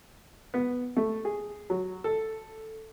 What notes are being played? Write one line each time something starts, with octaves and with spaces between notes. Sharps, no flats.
B3
A3
G#4
F#3
A4